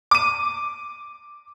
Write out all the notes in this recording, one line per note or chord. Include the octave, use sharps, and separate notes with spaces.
D6 D#7